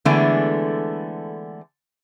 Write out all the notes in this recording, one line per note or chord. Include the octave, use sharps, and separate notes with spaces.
D3 E3 G#3 A3 B3 D4